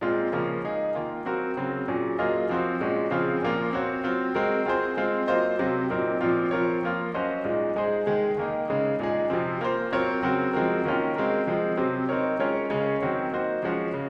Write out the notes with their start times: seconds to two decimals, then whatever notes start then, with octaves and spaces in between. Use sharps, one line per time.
0.01 A#2 G#3 C4 F4
0.32 C#3 F3 A#3 C#4
0.64 G#3 D#4 G#4
0.95 D#3 A#3 F4
1.25 F#3 C4 F#4 A#4
1.57 C#3 F#3 C4
1.88 A#2 F#3 C#4 G#4
2.19 F#3 A#3 F4 G#4 D#5
2.49 F3 C4 F#4 C5
2.81 A#2 G#3 C#4 F#4
3.11 C#3 F3 C4 F4 G#4
3.42 A#2 F3 A#3 F4
3.73 C4 F#4 C#5
4.04 F#3 C4 F4
4.35 G#3 C4 F#4 A#4
4.66 C4 F4 G#4 C5
4.97 G#3 C4 F4
5.27 F#3 A#3 F4 C5 D#5
5.59 C3 F#3 C4
5.90 A#2 F#3 C4 D#4 A#4
6.21 A#2 F3 C4 F4
6.51 F3 C4 F4 A#4 C#5
6.83 F3 A#3 F4
7.14 F#3 C#4 F#4 C5 D#5
7.44 A#2 G#3 D#4
7.76 G#3 D#4 G#4 C5
8.06 D#3 G#3 D#4 G#4
8.38 D#3 A#3 D#4
8.68 C#3 G#3 D#4
8.99 A#2 G#3 D#4 G#4
9.30 C3 F3 C4
9.61 A#3 F4 C5
9.92 F#3 C4 F4 A#4 C#5
10.22 C#3 F#3 C4 F#4 A#4
10.53 F3 G#3 C4 F#4 A#4
10.85 D#3 A#3 C#4 F4
11.15 G#3 C4 F#4 A#4
11.47 F3 G#3 C4
11.77 C3 F#3 C4
12.09 C4 D#4 A#4 C#5
12.39 G#3 C#4 F4 A#4 C#5
12.70 C#3 G#3 C#4 G#4 C#5
13.02 D#3 F#3 C4 F#4 C#5
13.32 A#3 D#4 F#4 C5
13.63 F3 G#3 C#4 F#4
13.94 C#3